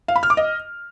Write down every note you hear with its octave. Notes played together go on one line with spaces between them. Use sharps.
F5
B5
F6
D6
D#5